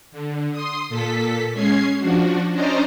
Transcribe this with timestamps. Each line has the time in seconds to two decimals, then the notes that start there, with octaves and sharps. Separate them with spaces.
0.12 D3
0.52 C6 D#6
0.89 A#2 A4 B6
1.53 G#3 C#4 G#6 C7
1.98 F3 D4 F#4
2.52 C#4 D4 C5 D5 D#5 A#5